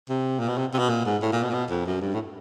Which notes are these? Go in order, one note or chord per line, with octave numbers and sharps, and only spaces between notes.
C3
A#2
B2
C3
C3
B2
A#2
G#2
A2
A#2
B2
A#2
B2
F2
F#2
G2
A2